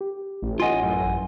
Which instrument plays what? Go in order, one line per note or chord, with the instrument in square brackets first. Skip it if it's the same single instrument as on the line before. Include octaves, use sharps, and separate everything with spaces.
[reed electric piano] G4
[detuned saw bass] A1
[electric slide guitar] F4 D#5 [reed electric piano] F#5 G#5 C6
[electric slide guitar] F#2